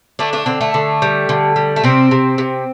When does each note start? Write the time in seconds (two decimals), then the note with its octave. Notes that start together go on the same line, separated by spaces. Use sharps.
0.19 D3 A3 D4
0.33 A3 D4
0.46 D3 C4
0.61 A3
0.74 D3
1.02 G3
1.29 D3
1.56 G3
1.76 A3
1.84 C3 C4
2.11 C3
2.38 C3